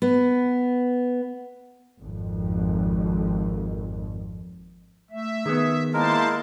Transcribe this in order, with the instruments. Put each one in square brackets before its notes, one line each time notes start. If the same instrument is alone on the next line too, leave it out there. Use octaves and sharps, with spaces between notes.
[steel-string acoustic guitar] B3
[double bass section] G#1 F2
[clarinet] A3 [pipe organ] E5
[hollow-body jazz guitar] D#3 B3 [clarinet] G#4
[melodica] G#3 A#4 [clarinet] A#3 [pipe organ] E4 C5 A5